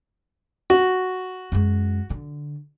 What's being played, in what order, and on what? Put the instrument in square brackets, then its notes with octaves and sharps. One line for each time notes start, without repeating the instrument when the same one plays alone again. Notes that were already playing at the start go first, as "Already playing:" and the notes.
[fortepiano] F#4
[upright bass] F#2 G#3
D3